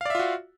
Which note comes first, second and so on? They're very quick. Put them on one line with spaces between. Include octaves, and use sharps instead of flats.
F5 D5 E5 F4 F#4